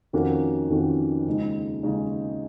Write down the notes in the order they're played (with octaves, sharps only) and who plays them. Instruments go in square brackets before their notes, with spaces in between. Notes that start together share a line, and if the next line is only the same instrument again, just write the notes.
[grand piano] F2 D#3 A#3 C#4 F#4
F2 D#3 A#3 C#4 F#4
D#2 C#3 G#3 D#4
D#2 C#3 G#3 D#4